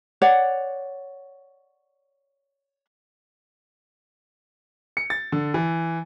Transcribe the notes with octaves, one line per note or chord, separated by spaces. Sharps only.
C#5 D5 F#5
C#7
A6
D3
E3